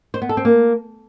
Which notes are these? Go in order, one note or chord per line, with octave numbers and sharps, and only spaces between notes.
C5
B3
A4
C4
A#3